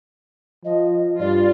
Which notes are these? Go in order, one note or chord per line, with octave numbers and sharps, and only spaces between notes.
F3 D#5
G2 F4 D5